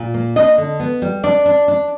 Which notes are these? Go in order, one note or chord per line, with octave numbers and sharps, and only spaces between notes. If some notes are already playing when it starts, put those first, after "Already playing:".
Already playing: A#2
A#3
D4 D#5
D3
B3
G3
D4 D5
D4
D4